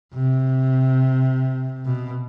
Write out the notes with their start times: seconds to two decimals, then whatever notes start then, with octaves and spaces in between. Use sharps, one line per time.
0.14 C3
1.85 B2